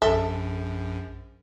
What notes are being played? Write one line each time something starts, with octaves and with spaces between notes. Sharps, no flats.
A#1 F#2 A4 E5